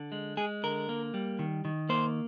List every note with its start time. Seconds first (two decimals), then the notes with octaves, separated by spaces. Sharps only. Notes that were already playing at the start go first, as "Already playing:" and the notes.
Already playing: D3
0.12 G#3
0.37 G#3 G#4
0.63 D3 A#4
0.89 A#3
1.14 G3
1.39 D#3
1.65 D#3
1.89 A#3 C5